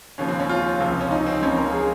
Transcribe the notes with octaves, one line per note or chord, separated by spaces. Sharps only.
D#2 C#3 F3 C#4
C4
C#4
F4
C#2 C3 F3
C#4
D#4
C4
C#2 C#3 F3 C#4
A#4
G#4